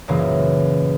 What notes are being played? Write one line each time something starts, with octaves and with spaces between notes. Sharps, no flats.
B1 F#2 A#2 C#3 E3 A#3